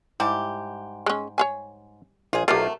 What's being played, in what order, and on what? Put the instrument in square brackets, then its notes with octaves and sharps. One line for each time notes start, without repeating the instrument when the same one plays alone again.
[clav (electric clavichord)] G#2 [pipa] G3 E4 G4
[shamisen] G#3 C#4
C#5 F5 G#5
[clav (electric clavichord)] A#1 [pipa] F4 G#4
[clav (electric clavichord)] B1 F4 [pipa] C3 F#3 A3 [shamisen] G4 A#4